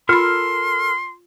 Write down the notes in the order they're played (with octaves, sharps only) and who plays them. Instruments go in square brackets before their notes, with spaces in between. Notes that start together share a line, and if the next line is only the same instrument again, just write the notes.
[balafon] F4 B5 [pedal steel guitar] A4 A#4 F6 [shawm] C6